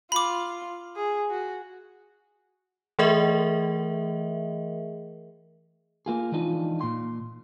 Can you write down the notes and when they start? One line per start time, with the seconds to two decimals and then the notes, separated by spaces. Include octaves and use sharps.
0.12 F4 B5 D6
0.96 G#4
1.30 F#4
2.99 E3 A3 G#4 A#4 D#5 E5
6.06 A#3 F4 G#4
6.32 E3 F3 G#3 D4 D#4 F4
6.81 A#2 C6